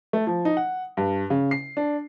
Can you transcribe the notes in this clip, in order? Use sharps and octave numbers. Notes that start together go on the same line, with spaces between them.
A3
F3
D#4
F#5
G2
C#3
C7
D4